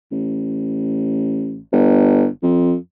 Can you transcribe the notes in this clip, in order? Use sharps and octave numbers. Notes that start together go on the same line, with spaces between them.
A1
G1
F2